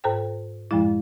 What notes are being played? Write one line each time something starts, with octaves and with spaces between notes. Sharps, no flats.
G#2 A4 C5 G5
F#2 A2 F3 G#3 E4